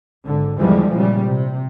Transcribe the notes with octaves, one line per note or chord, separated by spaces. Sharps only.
G#1 D3
E2 D3 E3 F3 G3 G#3
A#2 C#3 G3
C3